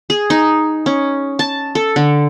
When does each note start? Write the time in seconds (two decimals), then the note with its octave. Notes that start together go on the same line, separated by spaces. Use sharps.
0.10 G#4
0.30 D#4
0.86 C#4
1.39 A5
1.75 A4
1.96 D3